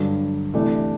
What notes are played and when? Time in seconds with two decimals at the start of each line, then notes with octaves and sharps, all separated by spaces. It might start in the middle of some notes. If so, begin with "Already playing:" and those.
Already playing: G2 D3 F#3
0.54 C3 E3 A3 D4